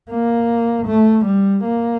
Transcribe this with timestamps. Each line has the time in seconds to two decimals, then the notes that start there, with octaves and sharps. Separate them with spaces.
0.11 A#3
0.87 A3
1.26 G3
1.64 A#3